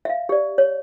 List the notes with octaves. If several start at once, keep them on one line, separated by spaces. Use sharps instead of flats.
E5 F5
G4 D5
C#5